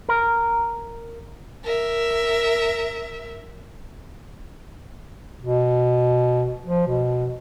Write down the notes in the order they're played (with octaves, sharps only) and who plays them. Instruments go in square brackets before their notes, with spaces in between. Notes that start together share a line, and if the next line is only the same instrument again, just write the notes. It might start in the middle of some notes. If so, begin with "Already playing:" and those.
[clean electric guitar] A#4
[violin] A#4 E5
[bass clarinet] B2
F3
B2